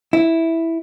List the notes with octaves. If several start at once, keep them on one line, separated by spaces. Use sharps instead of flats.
E4